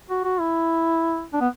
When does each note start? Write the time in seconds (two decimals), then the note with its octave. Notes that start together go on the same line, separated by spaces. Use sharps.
0.10 F#4
0.24 F#4
0.40 E4
1.33 D4
1.41 B3